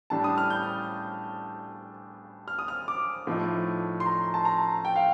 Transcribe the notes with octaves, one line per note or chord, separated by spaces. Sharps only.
A2 G3 D4 A5
D#6
F6
G6
F6
D#6
F6
D6
A2 F3 A3 D#4
C6
A#5
A5
A#5
G5
F5